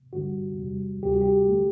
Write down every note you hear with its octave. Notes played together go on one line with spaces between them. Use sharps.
G2 D3 G3 F#4
E2 C3 G3
D2 C3 G3 G4
F#4
G4
D3 A3